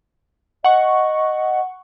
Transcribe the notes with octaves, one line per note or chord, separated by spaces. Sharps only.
D#5 F#5 C#6